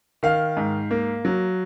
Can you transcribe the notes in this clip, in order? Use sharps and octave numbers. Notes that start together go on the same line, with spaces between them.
D#3 F5
G#2
A#3
F#3